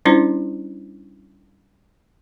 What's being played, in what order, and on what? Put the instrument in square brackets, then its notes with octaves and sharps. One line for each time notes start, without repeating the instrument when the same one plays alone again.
[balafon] G3 C#4 D4 E4 F4 C5